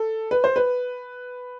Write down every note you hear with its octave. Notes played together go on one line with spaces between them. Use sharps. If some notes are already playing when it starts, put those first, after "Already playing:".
Already playing: A4
B4
C5
B4